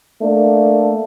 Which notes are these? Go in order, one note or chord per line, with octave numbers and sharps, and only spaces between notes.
A3 A#3 D4 A4